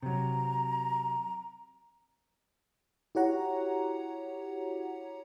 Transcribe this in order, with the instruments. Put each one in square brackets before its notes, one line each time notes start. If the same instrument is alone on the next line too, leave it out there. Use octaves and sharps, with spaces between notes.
[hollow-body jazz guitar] C3 F#3 [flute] A#5
[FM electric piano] E4 F#4 G4 C#5 F#5 A#5